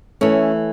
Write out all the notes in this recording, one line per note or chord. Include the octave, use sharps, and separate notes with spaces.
E3 A3 C#4